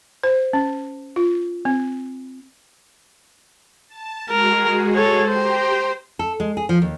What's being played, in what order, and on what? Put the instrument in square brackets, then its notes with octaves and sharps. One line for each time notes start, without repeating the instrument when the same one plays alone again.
[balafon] C5
C#4
F4
C4
[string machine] A5
[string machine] G#3 F#4 G#4 [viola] A#4
[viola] A4 C#5
[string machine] G4 G5 A#5 [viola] C5
[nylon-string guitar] A4
G#3
G#4
F3
D#2